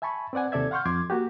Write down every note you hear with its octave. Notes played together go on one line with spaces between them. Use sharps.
E5 G#5 A5 B5 C#6
C4 B4 D5 F#5 G#5
D#2 C3 A4 D5 E5 G#6
F5 F#5 C6 C#6 F6 G6
F2 C6 D6 G#6
A#3 F#4 G4